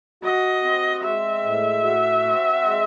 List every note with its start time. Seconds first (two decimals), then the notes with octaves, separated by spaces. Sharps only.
0.23 F#4 D#5
0.64 C4
1.03 G#3 E5
1.43 A2
1.83 F#4
2.24 C4
2.63 G#3